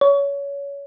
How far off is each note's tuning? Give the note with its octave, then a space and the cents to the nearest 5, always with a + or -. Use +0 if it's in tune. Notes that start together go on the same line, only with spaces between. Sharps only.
C#5 +25